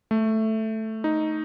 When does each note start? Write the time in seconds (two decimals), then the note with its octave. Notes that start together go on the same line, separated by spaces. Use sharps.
0.11 A3
1.04 D#4